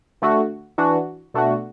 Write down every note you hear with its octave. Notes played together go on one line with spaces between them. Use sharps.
D3 A3 F#4
E3 D4 F#4
B2 A3 D4 F#4